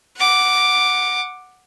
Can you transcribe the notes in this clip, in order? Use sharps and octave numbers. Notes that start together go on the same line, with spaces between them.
F#5 D6